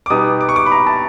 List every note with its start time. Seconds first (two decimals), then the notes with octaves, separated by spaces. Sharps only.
0.06 D6
0.10 B2 G3 B3 D#4 D#6
0.41 D6
0.49 C#6
0.56 D6
0.66 B5
0.72 A#5
0.87 A5